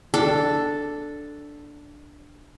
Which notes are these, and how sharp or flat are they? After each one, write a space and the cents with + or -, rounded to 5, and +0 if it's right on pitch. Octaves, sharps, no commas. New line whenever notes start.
D4 +0 A4 +0